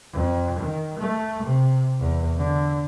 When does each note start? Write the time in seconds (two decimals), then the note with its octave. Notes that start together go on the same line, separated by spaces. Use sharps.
0.13 F2
0.59 D#3
0.99 A3
1.43 C3
2.00 E2
2.37 D3